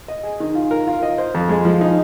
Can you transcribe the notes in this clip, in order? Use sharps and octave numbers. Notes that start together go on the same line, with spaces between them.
D#5
G#4
D#3
F4
A#4
F4
D#5
C5
F2
G#3
F3
D#4